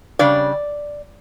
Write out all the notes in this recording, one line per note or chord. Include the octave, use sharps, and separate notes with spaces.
C#3 G3 D4 D5